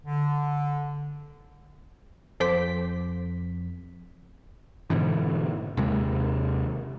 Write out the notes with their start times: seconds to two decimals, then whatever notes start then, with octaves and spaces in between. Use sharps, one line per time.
0.05 D3
2.40 F2 A4 C5 D6 B6
4.90 G#2 B2 D3 E3
5.77 D#2 C3 G#3